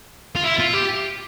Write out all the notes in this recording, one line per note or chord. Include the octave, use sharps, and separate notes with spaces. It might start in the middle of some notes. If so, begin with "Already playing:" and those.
F4
E4
F4
G4